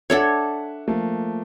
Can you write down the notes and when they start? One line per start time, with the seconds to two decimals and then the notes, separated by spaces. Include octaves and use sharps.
0.10 D4 A4 C#5 E5 F#5
0.88 F3 A3 A#3